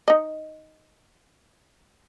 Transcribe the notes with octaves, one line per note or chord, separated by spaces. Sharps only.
D#4 D#5